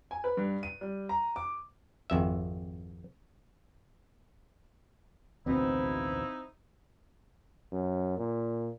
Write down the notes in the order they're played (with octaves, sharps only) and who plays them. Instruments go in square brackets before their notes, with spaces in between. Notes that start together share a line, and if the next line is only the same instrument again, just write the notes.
[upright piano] G#5
B4
G2
D#7
G3
A#5
D6
[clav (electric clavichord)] G#1 F2 E5
[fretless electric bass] A1 D2 B2 [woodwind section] F3 D#4 E4 [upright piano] C4
[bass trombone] F#2
A#2